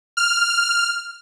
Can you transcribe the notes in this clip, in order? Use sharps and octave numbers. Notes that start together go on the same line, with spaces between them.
F6